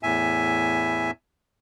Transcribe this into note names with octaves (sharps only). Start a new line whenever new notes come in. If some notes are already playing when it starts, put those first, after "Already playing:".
E2 A2 E5 G#5